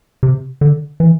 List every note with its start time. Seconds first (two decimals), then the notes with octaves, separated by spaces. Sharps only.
0.23 C3
0.61 D3
1.00 E3